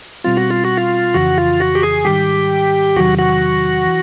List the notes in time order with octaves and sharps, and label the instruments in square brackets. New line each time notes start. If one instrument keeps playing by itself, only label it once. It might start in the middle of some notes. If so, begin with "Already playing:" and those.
[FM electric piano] B2 G3 C4 [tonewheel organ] F4
[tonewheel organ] F#4
F4
F#4
F4
[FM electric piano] F2 C#3 E3 [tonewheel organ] F#4
[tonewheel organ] F4
F#4
G4
G#4
[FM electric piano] G#2 D#3 G3 [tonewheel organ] G4
[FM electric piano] E2 C3 D#3 F#3 [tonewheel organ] F#4
[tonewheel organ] F#4
[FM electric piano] E3